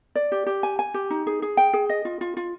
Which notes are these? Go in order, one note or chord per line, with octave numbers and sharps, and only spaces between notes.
D5
G4
G4
G#5
G#5
G4
D#4
G#4
G#4
G5
G#4
D#5
F4
F4
F4